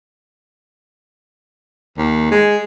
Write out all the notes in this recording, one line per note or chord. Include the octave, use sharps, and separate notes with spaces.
D#2
G#3